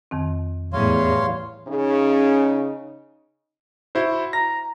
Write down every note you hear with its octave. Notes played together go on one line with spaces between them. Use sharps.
F2 D#3 C4
E2 A2 G3 C#5 F5 C6
C#3 C#4 D#4
E4 F#4 C5
A#5 A#6